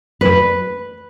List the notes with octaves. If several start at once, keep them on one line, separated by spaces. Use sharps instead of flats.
B4